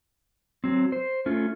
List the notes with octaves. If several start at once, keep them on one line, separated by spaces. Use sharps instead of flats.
F#3 C4
C5
A3 C#4 F4